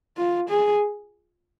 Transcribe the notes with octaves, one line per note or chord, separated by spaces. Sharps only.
F4
G#4